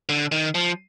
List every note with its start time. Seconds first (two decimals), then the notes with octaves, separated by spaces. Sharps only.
0.09 D3
0.32 D#3
0.55 F3